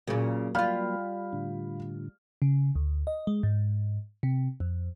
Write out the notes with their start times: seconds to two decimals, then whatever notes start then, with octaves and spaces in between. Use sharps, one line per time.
0.07 A#2 C#3 F#3 A#3
0.55 G3 F4 F5 B5 F6
1.33 A2 D3
2.42 C#3
2.75 D2
3.07 D#5
3.27 G#3
3.43 G#2
4.23 C3
4.60 F2